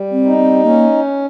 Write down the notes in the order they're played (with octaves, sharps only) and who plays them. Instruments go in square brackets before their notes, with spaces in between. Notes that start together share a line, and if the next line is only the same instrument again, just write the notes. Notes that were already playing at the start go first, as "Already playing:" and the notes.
Already playing: [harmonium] G3
[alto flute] C4
[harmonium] D#4
[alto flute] C4
[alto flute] A#3 [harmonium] C#4